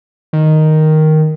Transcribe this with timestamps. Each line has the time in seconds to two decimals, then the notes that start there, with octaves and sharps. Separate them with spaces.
0.33 D#3